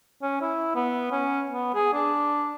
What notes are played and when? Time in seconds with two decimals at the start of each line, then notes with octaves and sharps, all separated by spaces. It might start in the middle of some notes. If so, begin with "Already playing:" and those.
0.22 C#4
0.42 E4
0.75 B3
1.12 C#4
1.52 B3
1.75 G#4
1.93 D4